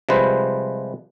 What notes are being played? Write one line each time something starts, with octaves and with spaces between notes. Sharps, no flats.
C3 F3 G3 G#3 B4 C5